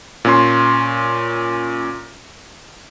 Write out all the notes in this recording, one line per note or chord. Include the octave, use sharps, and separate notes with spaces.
A#2 C#4 C6